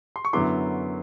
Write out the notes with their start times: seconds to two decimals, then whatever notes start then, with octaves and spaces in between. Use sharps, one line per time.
0.16 C6
0.25 C#6
0.33 F#2 D3 F#3 B3 E4 C6 D6